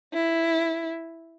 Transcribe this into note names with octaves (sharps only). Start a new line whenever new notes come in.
E4